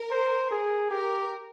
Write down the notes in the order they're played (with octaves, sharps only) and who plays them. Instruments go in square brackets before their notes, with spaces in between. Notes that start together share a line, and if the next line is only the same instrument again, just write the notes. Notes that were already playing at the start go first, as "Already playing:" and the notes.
Already playing: [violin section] A#4
[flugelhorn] C5
G#4
[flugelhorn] G4 [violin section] A#4